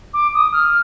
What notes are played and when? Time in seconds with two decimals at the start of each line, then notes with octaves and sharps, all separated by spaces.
0.13 D6
0.34 D#6
0.53 F6